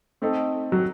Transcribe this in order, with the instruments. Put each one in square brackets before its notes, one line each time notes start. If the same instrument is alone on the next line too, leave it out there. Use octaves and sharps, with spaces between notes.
[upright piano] A3 C4 D#4 A4
[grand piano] F#3